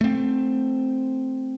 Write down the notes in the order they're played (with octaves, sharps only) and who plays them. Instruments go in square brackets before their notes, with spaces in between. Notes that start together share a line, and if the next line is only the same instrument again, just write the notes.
[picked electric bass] A3 C4